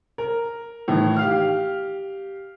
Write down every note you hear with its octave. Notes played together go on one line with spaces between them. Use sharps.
A#4
A2 D#3 E3
G4 F5 F6